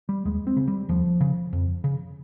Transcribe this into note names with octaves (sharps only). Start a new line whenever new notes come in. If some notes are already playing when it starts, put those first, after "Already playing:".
G3
D#2 G#3
C4
C#3
G3
D#2 F3
C#3
F2
C#3